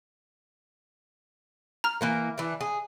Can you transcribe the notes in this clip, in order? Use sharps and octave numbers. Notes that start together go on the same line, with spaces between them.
A#5 F6
E3 A#3 A#4
E3 D4
G#4